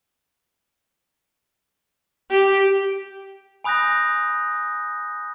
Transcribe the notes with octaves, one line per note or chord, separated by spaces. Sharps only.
G4
G#5 B5 D#6 F#6 G6 A#6